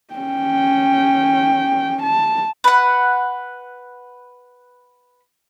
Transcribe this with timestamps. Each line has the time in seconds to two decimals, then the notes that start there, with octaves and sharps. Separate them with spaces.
0.14 C#4 G5
2.03 A5
2.64 B4 F#5